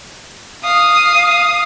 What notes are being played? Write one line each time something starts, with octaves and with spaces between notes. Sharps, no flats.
F5 D#6